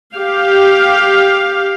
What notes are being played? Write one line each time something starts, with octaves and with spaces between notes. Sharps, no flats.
G4 F5